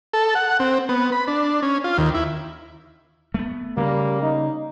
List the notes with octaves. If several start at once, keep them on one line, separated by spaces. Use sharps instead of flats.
A4
F#5
C4
B3
B5
D4
C#4
F4
D#2
E4
A3 B3
C#3 G3 A#3
D#4